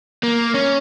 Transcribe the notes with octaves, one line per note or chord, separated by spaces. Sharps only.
A#3
C#4